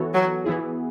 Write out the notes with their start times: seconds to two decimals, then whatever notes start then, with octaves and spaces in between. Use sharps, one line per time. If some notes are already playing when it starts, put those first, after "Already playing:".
Already playing: E3 B3 F#4 A4 C#5
0.14 F#3
0.44 E3 B3 E4 G#4